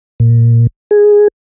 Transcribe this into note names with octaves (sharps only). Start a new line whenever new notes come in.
A#2
G#4